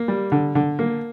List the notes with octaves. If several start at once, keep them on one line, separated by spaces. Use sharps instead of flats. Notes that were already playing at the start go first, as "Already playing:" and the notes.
Already playing: A#3
G3
D3
D3
A#3